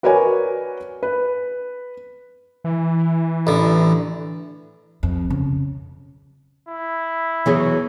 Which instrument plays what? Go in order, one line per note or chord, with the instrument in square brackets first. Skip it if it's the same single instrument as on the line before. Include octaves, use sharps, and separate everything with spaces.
[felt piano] F#4 A#4 B4 C#5 D5 G#5
B4
[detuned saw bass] E3
[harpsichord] A1 D3
[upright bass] F2
C#3
[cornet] E4
[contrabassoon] E2 [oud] E3 F#3 G#4